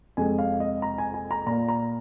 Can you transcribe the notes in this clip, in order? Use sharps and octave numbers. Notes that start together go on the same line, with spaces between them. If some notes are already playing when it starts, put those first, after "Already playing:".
F2 C3 G#3 G#5
F5
D#5
A#5
G#5
G#5
A#5
A#2 A#3 A#5
A#5